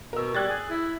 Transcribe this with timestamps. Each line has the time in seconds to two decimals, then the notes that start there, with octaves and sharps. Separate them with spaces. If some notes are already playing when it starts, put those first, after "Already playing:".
0.13 B2 A#4 E6
0.35 G3 F#6 G#6 A6
0.48 G#4
0.70 E4